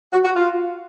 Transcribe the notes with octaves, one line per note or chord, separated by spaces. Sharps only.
F#4
F#4
F4